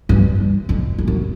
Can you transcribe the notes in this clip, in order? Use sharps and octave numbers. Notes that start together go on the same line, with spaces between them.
G2
F2
F2
F#2